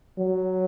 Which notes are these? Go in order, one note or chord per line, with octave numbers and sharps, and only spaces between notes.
F#3